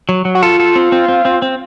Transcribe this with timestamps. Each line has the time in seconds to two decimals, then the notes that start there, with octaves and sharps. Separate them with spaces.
0.09 F#3
0.25 F#3
0.35 F#4
0.42 F4 A4
0.60 A4
0.76 C4
0.92 C4
1.09 C4
1.25 C4
1.42 C4